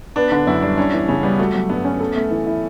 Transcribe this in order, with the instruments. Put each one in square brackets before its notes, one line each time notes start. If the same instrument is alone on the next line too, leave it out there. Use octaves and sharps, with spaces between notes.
[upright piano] B3 [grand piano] D4
[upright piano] D3 [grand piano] D4
[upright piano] F#2 [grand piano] E4
[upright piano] G3 [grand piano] D4
[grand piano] C#4 [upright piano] D4
[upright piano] E3
[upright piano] C#3 [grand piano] C#4
[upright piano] G3 [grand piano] B3
[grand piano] A3 [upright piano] F#4
[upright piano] F#3
[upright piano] G2 [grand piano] B3
[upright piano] C#4
A4
A3
E3
E4